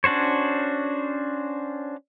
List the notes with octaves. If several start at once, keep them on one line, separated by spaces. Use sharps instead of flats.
C#4 D4 F#4 C5 C#5